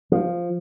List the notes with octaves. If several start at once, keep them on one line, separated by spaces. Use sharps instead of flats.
F3